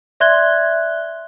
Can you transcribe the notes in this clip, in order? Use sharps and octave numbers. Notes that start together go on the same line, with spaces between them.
D5 E5 C6 F#6 G#6 G7